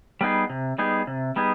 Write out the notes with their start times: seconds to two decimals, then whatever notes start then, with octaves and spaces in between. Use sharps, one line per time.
0.21 G3 B3 D#4 G#4
0.50 C3
0.78 G3 B3 D#4 G#4
1.07 C3
1.36 G3 B3 D#4 G#4